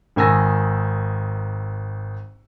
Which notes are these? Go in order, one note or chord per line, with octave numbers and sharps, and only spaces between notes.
G#1 D#3 G#5 E6 A#6